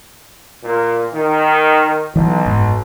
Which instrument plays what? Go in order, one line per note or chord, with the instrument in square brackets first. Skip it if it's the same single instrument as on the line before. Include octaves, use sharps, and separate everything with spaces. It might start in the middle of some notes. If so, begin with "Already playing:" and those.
[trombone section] A#2
D#3
[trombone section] B1 [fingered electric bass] E3 F#3
[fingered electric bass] F#1 G#2